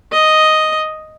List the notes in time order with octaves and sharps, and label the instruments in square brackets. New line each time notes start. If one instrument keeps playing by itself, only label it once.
[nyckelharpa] D#5